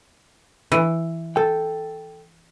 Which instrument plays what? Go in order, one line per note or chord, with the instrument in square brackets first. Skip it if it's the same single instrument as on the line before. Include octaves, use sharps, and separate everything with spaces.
[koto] E3
[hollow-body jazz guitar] A4 G5